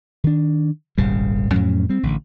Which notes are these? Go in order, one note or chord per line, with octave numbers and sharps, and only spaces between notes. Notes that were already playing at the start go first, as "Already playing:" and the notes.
D#3 D4
D#1 G#1 C#3 G3
F2 A2 F#3 C#4
G3 C4
A1 D3